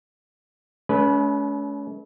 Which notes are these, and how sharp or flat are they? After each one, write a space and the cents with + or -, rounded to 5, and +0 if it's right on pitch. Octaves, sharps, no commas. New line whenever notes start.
A3 -45 C#4 +35 B4 -15